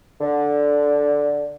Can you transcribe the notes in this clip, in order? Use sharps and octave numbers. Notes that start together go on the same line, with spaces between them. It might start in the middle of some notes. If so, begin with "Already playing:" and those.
D3